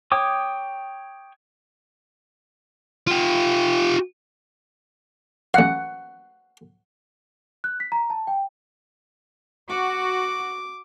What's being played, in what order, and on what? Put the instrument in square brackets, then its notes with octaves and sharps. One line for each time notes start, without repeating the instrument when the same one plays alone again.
[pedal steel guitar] C#5 G5 D6 D#6
[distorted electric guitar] F4 G4
[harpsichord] A1 F5 [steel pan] F#5
[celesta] F#6
B6
A#5
A5
G5
[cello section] F#4 [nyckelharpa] D6